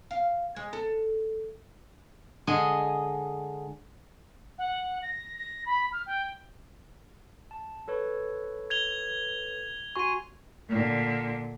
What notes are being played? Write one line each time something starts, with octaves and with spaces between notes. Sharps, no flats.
F5
G#3
A4
D3 G#3 D#5 G#5
F#5
A#6
A#6
B5
F6
G5
A5
A4 B4 C#5
G#6 F7 G7
F#4 G#5 C6 C#6 D#7
A#2 D3